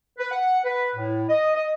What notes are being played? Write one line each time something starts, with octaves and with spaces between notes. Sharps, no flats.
B4
F#5
B4
A2
D#5
D#5